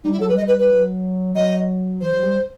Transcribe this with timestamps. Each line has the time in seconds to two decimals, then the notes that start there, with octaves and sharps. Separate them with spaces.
0.04 G3 D#4
0.12 E4
0.18 F#3 A4
0.29 G3 B4
0.37 D#5
0.48 B4
0.59 B4
0.70 F#3
1.35 F#3 D#5
2.01 E3 C5
2.13 F#3
2.23 G3